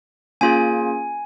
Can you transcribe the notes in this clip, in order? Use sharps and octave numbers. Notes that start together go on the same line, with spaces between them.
A#3 C#4 F4 G#4 G#5